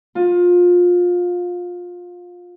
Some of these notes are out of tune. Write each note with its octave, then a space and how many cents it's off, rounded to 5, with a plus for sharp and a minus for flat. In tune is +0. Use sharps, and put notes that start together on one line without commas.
F4 +25